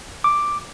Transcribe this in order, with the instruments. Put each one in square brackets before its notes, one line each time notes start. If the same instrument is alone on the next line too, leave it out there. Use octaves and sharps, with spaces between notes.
[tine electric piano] D6